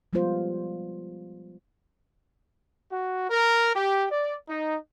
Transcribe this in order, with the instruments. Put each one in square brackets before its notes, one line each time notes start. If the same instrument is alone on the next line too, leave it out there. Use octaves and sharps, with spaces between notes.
[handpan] F3 G3 G#3 B3 F4 C5
[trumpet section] F#4
A#4
G4
D5
D#4